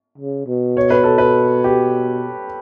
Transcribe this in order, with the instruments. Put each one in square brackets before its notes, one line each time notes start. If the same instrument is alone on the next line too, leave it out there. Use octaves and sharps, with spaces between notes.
[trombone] C#3
B2
[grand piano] C#5
B4
A4
B4
G4